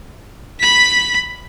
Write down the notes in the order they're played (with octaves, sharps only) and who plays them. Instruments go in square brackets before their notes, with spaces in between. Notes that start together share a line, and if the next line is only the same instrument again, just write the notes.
[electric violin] B5 B6